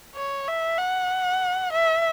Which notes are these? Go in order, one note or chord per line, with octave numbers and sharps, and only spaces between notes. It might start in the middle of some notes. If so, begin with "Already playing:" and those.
C#5
E5
F#5
E5